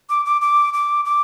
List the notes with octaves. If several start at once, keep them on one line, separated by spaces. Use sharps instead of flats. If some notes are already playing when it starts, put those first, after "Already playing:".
D6
D6
D6
D6
D6